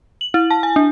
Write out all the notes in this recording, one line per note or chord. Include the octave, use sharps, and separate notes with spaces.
F#7
E4
A5
G#5
D4